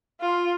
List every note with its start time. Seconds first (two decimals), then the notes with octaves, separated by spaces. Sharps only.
0.20 F4